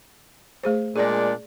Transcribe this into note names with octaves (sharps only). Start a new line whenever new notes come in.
A3 G#4 C5
A#2 G#3 D4 G#4 D5